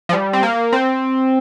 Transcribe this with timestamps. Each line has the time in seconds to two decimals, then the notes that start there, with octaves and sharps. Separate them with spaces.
0.09 F3
0.13 G3
0.33 C4
0.43 A#3
0.73 C4